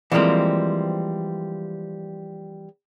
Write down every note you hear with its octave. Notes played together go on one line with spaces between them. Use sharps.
E3 F3 G3 G#3 A#3 C4